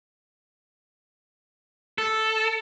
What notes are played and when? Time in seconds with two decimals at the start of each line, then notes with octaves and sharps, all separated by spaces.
1.98 A4